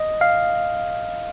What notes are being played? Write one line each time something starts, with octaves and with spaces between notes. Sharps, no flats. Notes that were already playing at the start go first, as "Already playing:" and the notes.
Already playing: D#5
F5